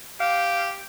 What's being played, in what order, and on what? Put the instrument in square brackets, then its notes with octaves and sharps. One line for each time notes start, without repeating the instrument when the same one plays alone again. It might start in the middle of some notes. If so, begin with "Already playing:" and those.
[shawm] G4 [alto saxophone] F5